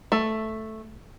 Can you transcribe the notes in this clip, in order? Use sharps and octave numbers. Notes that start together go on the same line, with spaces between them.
A3